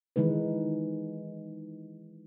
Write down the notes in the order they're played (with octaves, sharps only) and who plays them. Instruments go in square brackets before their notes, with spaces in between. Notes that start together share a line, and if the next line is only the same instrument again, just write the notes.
[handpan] D#3 E3 G#3 D#4 B4